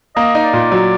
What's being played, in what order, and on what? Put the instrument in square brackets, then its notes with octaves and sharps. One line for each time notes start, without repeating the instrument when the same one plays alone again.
[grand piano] A#3 [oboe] D#5
[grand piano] D#4
[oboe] D5
[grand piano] A#2
F#3